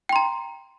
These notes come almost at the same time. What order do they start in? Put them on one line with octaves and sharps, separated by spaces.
G5 C6 A#5